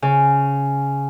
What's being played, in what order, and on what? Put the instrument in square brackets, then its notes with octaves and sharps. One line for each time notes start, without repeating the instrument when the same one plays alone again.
[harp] C#3